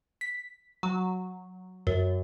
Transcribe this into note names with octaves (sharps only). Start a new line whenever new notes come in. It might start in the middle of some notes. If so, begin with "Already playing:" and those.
B6
F#3
F#2